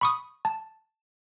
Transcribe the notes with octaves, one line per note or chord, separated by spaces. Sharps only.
B5 C#6 D#6
A5